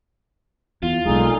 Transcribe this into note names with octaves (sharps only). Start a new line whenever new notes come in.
E2 F4
B1 A#2 G#3 D#4 G#4 A4